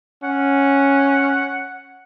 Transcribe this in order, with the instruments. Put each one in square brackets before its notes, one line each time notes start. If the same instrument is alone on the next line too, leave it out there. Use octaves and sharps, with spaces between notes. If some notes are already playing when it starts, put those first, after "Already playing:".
[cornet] C#4 [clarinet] F#5